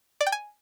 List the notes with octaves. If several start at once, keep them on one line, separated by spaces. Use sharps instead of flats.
D5
G5
G#5